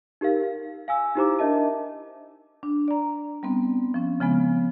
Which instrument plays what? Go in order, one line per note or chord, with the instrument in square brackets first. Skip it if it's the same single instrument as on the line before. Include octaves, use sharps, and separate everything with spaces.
[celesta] D#4 G4 A#4 F5
F5
F5 G#5 E6
D#4 E4 G4 C5 A#5 D6
D4 A#4 D#5 E5 A5
[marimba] D4
D5 A#5
G3 B3 C4
F3 C#4
C#3 F3 G#3 B3